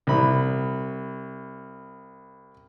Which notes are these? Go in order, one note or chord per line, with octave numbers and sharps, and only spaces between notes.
C2 B5